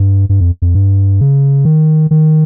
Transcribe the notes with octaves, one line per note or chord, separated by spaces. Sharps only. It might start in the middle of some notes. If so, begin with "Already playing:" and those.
Already playing: G2
G2
F2
F2
G2
C#3
D#3
D#3